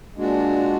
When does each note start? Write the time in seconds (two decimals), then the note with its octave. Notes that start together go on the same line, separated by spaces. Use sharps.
0.15 A#2 G#3 D4 F#4